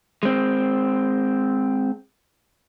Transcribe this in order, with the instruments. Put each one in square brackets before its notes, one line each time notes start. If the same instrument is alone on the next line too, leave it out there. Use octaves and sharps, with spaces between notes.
[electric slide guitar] G#3 C4